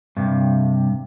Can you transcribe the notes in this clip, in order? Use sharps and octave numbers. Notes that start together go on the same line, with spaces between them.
G2 C3